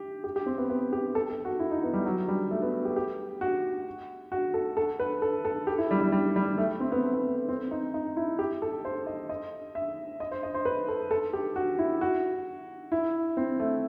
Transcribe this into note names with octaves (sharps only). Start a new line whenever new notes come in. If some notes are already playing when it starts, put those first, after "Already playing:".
Already playing: G4
G4
G4
C4
B3
B3
G4
A4
A4
F#4
E4
D#4
B3
G3
F#3
G3
A3
B3
G4
G4
F#4
F#4
A4
A4
B4
A4
A4
G4
E4
G3
G3
G3
G3
A3
C4
B3
A3
B3
C4
D#4
D#4
E4
G4
A4
C5
D#5
D#5
E5
D#5
C5
D#5
C5
B4
A4
A4
G4
F#4
E4
F#4
E4
C4
A3